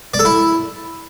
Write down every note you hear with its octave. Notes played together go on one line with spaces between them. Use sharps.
D5
A4
E4